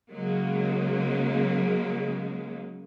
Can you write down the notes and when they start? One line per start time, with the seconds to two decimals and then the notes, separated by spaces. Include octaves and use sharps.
0.11 C#3 F#3 G#3 A#3